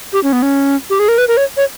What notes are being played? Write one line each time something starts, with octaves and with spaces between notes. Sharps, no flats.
G4
C#4
B3
C#4
G4
G#4
A#4
B4
A#4
C#5
C#5